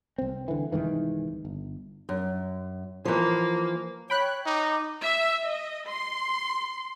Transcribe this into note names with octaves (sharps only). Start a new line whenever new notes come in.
C2 C4
D3 E3
C2 G#2 D#3 E3
G1
F#2
E3 F3 A#3
C#5 G5 B5 F#6
D#4 D6
E5
D#5
C6